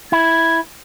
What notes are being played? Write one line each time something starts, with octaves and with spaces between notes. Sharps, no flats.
E4 G#6